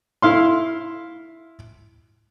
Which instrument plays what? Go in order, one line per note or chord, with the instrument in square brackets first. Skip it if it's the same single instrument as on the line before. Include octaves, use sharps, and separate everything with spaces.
[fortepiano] E4 F5 C6